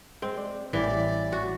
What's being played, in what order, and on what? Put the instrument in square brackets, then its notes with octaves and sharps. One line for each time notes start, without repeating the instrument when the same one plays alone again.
[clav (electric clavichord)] G#3 [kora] C4
[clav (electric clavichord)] D5
[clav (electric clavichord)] A1 G3 G5 [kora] E3 [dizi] D5
[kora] F#4